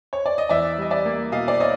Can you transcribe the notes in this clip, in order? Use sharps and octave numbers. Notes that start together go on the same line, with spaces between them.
C#5
D5
D#5
E2 D5 E5
G3 D#5
D5 E5
A#3
B2 D#5 F5
D5
C#5 D#5